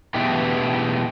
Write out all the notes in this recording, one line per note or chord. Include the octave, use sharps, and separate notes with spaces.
B2 E3 G#3 A3 G4